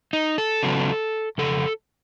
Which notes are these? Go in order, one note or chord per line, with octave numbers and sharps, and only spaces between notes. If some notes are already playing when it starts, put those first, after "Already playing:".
D#4
A4
C#3 F#3 B3
F2 C#3 A4